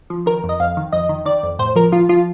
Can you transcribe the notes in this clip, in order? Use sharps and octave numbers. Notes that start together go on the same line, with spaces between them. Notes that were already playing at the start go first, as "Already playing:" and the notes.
F3
D#3 A#4
F2
D#5
F2 F5
D#3
F2 D#5
D#3
D#3 D5
F2
A2 C5
F3 A#4
F3 F4
F3 F4